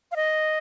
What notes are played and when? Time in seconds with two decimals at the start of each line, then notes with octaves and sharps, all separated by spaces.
0.12 F5
0.16 D#5